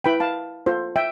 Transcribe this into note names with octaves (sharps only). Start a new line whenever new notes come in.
E4 B4 G5 B5
F5 A5
F4 A4 C5
E5 G5